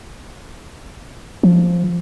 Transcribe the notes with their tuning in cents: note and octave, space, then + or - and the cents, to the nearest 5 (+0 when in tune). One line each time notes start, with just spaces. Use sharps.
F3 +0